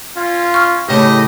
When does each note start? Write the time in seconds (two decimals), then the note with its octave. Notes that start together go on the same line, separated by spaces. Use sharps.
0.17 C#4 F4
0.54 C#6 F6
0.88 A2 C#3 A3 G4 D#5